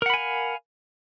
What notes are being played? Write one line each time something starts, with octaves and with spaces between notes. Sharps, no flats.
A#4 F5 F#5 G#5 B5